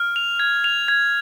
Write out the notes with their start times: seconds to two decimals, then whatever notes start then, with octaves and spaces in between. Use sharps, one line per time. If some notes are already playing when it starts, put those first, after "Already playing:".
Already playing: F6
0.16 F7
0.40 G#6
0.64 F7
0.88 G#6